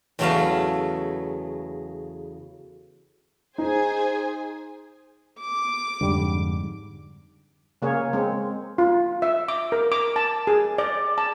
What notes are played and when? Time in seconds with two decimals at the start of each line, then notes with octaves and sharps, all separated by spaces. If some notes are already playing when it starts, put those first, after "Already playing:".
0.19 E2 C#3 F#3 A3 B3 F5
3.58 D#4 G#4 C5 G#5
5.40 D6
6.01 F2 G#2 D3 G3
7.82 C#3 A#3 G#4 C#5
8.13 G#3 C4
8.78 F4
9.22 E5
9.48 D6
9.72 A#4
9.92 D6
10.16 A5
10.47 G#4
10.78 D5
11.18 A5